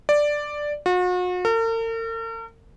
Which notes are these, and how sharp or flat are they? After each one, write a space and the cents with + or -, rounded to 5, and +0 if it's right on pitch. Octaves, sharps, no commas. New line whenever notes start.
D5 +5
F#4 -40
A#4 -45